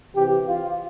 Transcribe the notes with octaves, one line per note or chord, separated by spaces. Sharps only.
C3 E3 G4
F4